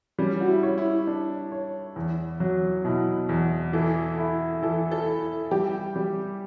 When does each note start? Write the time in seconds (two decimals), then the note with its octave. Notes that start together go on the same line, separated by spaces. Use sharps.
0.19 G3 C#4
0.40 F#4
0.48 E4
0.63 C#5
0.78 E4
1.07 D4
1.52 C#5
1.96 E2
2.40 F#3
2.85 B2 E4
3.29 E2
3.73 E3 A4
4.18 E4
4.63 E3 A4
4.91 A4
5.07 E4
5.51 G3 G4
5.96 G3